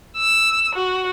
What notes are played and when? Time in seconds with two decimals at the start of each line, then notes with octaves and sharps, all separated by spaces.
0.18 E6
0.75 F#4